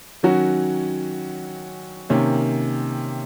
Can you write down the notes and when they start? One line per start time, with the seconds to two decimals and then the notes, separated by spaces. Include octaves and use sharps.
0.23 D#3 F#3 C#4 F#4
2.10 C3 D#3 A#3 C#4